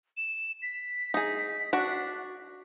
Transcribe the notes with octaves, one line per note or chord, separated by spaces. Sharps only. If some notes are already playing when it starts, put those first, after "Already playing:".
E7
B6
D#4 G#4
D4 F#4